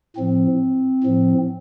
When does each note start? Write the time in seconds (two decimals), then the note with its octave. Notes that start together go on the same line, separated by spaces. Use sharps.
0.16 A2 F3 C4
1.03 A2 F3